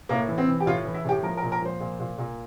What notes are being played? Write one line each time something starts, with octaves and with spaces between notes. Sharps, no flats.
A2 A#3
E3
C4
E3
G4
A2 F4
E3
E4
A2 G4
F3 A#4
A#4
A#2
A#4
F3 C5
A#2
A#2
A#2